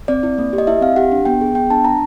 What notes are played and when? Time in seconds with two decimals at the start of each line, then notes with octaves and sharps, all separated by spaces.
0.08 C4 D5
0.23 E4
0.38 A#3
0.53 G4
0.58 D#5
0.67 E4 E5
0.81 C4 F5
0.96 G4 F#5
1.12 D4
1.25 B3 G5
1.41 G#4
1.55 B3 G5
1.70 D4 A5
1.84 D4 A#5